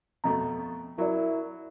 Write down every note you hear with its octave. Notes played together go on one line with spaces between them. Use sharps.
F2 B2 A3 A#5
F#3 E4 A#4 D5